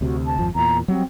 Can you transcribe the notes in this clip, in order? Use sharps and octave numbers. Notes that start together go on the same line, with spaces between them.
D2 C3 F#4
A5
G#1 F2 F3
E2 A#2 A#5
F#3 G3 C4